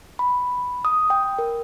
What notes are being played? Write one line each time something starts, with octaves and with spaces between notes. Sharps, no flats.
B5
D#6
G5
A#4